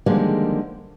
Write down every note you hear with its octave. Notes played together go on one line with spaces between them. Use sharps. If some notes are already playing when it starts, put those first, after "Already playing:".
D3 D#3 F3 G3 G#3 A#3